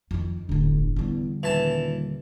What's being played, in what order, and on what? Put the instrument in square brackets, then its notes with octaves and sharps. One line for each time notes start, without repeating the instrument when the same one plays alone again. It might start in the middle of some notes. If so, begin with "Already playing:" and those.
[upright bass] F2 D#3
[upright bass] E1 A1 [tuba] D3
[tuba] E2 [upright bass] D3 G3
[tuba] D#1 [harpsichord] E3 A5